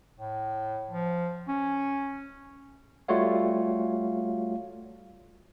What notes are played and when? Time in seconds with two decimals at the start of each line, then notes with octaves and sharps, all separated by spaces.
0.19 A2
0.90 F3
1.48 C#4
3.08 G3 A3 F4 F#4 C#5 F5